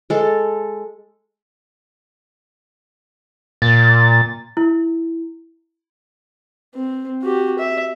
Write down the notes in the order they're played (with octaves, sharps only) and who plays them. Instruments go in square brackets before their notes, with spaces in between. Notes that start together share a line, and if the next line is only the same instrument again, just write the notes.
[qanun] G#3 A4
[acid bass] A#2 [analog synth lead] A6
[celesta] E4
[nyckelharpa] C4
F#4 G4
E5